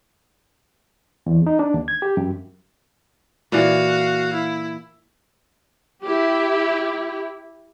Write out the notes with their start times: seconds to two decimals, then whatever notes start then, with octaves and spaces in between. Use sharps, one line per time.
1.26 E2
1.47 D#4
1.59 D4
1.74 D#2
1.88 G#6
2.02 G4
2.17 F#2
3.52 A#2 E3 F#4 F5
4.34 E4
6.04 E4 G4